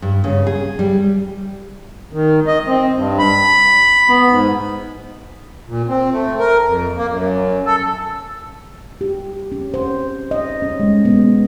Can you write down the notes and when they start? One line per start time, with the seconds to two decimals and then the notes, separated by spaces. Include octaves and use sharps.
0.02 G2
0.24 C#3
0.47 G#4
0.79 G3
2.13 D#3
2.47 D#5
2.66 C4
2.95 G2
3.19 B5
4.09 B3
4.29 G#2
5.68 A#2
5.89 C4
6.12 A3
6.39 A#4
6.65 F2
6.97 A#3
7.10 F#2
7.66 A4
9.01 G4
9.52 C#4
9.74 C5
10.31 D#5
10.62 C#4
10.80 G#3
11.05 B3